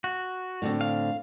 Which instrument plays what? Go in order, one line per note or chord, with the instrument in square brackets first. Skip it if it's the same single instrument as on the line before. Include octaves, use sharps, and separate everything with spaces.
[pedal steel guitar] F#4
[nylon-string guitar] A2 D3 C4
[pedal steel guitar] F5